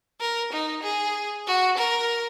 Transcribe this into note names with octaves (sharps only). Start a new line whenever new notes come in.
A#4
D#4
G#4
F#4
A#4